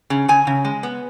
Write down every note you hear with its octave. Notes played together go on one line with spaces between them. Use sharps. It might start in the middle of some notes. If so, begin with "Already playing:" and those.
C#3
C#3 G#5
C#3
G#3
B3